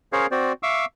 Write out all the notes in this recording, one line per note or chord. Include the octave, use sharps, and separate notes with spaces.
C#4 G#4 A#4 C5 C#5 F5
C4 F#4 C5 D5
E5 F5 C#6 D6 E6